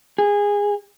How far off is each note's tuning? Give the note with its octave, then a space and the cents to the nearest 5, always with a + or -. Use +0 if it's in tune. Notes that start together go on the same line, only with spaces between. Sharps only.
G#4 -20